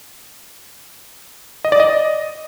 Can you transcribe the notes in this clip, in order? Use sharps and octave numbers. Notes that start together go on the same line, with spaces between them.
D#5
D5
D#5